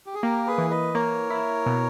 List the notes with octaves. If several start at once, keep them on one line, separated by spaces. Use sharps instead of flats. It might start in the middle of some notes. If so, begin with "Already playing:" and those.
G4
G#4
A#3 G4 A#4
G#4 B4
E3
B4 D#5
A#3 A#4 C#5
E4
B2